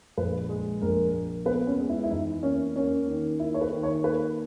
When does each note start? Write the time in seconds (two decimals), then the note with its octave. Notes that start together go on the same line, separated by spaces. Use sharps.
0.17 A#1 B4
0.49 G#3
0.82 A#1 A#4
1.14 A#3
1.45 B3 B4
1.67 C#4
1.79 G#3
1.89 E4
2.04 E4
2.11 E2 D#4
2.43 A#3 C#4
2.75 A#3 C#4
3.07 D#3
3.40 A#3 E4
3.54 C#5
3.61 B4
3.72 D#3
3.83 C#5
4.04 A#3 B4